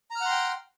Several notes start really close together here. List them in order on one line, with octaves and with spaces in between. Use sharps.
A#5 F6 F#5 C6 G5